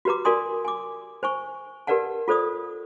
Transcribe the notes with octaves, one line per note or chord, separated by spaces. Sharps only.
F#4 G4 B4 A#5 D6
F#4 A#4 D5 G#5 C6 D#6
G#5 D6
C5 G#5 C#6
G4 A#4 B4 D5 F#5 A5
F4 A4 C5 D5 D#6